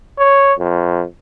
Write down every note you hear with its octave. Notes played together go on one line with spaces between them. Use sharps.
C#5
F2